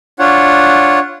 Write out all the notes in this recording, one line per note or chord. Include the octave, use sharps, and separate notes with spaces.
D4 F4 C#5 F#5